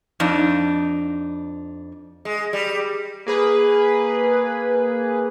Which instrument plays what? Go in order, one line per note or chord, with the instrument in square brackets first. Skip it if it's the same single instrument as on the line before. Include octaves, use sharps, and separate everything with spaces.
[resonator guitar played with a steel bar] F2 D4 D#4
[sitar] G#3
G3
[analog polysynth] A#3 G#4 B4